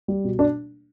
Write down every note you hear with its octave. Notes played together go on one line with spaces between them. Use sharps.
G3
B2
D4